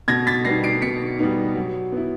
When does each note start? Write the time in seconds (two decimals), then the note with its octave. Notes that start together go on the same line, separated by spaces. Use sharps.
0.08 B2 G#6 A#6
0.27 A6 B6
0.45 G3 B3 D#4 A#6 C7
0.64 C7 D7
0.82 B2 B6 C#7
1.19 G3 B3 D#4
1.56 F#3
1.92 B3 E4